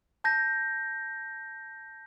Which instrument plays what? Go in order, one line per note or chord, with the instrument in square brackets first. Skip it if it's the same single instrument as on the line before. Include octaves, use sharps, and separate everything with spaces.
[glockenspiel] A5 G6 A#6